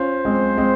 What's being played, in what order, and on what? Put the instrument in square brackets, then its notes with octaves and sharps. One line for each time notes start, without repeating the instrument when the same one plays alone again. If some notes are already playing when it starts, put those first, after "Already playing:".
Already playing: [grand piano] C#4 F4 [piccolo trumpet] C5
[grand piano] G#3 C4
G#3 C4